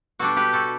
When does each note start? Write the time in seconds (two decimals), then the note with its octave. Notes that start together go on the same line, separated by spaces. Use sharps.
0.19 B2 G3 D4 F#4 A4
0.36 G4 B4
0.53 F#4 A4